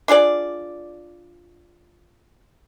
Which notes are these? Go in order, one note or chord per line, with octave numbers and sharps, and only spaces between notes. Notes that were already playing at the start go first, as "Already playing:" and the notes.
D4 F4 G#4 D5